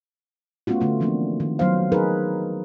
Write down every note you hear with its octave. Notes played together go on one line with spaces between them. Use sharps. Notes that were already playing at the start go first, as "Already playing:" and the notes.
A3 B3 C#4 F4 F#4
D3 A3 F4
E3 F3 A#3 C4 D4
D#3
F#3 B3 C5 F5
D#4 G#4 A#4 B4